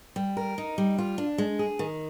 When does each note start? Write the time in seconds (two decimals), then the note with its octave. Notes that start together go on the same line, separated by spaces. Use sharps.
0.16 G3
0.37 A#4
0.58 D#4
0.78 G3
0.98 F4
1.18 D4
1.38 G#3
1.59 G#4
1.79 D#3